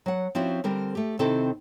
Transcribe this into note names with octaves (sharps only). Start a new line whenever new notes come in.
F#3 F#5
F3 C4 C#4 E4 F#4
D3 G3 C4 A#4
A3 G4
C3 D#3 C4 E4 A4